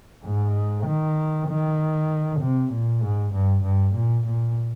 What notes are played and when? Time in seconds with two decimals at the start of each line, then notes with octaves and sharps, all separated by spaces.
0.24 G#2
0.86 D#3
1.48 D#3
2.40 C3
2.72 A#2
3.02 G#2
3.33 G2
3.63 G2
3.95 A#2
4.26 A#2